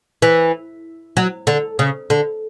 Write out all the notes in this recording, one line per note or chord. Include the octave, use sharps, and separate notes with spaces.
E3
F#3
D3
C#3
D3